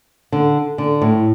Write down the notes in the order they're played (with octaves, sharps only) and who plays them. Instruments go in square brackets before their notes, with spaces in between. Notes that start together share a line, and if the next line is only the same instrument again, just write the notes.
[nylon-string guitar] D3
D3
A2